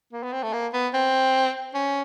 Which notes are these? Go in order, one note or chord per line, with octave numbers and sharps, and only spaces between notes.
A#3
B3
C4
A3
A#3
B3
C4
C#4